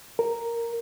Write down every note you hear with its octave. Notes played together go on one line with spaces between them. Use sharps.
A#4